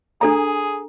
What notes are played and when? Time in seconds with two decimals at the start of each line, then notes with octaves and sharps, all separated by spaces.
0.21 D4 G#4 A4 A#5